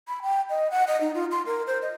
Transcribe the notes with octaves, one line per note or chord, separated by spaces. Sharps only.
B5
G5
D#5
F#5
D#5
D#4
F4
C6
A#4
C5
D#5